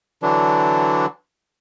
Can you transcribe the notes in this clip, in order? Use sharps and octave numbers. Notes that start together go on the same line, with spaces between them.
D3 E3 F#3 D4